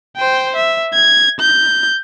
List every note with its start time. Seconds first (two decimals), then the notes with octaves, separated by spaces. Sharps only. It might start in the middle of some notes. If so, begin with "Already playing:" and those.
0.17 C5 G5
0.56 E5
0.94 G#6
1.40 G6